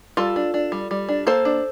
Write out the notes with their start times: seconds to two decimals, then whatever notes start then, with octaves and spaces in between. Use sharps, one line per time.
0.17 G3 F4 A4
0.36 D4
0.54 D4
0.72 G3
0.91 G3
1.09 D4
1.27 A#3 A4 C5
1.45 D4